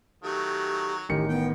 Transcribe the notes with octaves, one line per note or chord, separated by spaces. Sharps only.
D#3 F#3 A3 G4
A1 D#3 G4 C#7
B3 G5